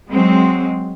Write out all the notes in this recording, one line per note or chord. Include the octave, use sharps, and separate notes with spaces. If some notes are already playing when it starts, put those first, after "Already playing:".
F#3 G#3 C4